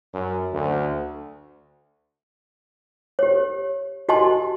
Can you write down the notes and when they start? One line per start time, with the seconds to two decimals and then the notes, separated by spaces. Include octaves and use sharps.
0.14 F#2
0.53 D2
3.19 G4 C#5
4.09 F#4 G4 D#5 G#5 A5 C6